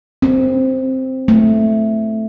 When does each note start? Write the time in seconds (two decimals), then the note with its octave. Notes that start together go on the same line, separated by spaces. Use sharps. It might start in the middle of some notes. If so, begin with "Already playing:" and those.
0.22 C4
1.28 A3